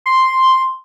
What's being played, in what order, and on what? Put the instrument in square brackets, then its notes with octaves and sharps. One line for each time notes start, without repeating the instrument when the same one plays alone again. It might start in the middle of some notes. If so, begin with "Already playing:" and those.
[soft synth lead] C6